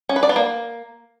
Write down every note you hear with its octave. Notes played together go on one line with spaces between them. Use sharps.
C#4
B4
D5
B3
A#3